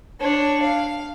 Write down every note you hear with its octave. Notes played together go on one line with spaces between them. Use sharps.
D4 C#5
F5